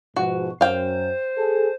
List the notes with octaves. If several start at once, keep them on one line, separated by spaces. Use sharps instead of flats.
G#2 B2 F3 F#4
F#2 C5 F5 G5
G#4 A4